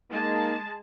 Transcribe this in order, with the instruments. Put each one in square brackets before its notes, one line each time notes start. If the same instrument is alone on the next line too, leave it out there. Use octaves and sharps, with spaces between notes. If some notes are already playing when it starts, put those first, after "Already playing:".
[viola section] G#3 A5 [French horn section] A#3 D#4